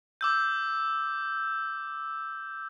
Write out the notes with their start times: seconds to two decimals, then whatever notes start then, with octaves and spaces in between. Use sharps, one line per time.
0.21 D6 E6 G6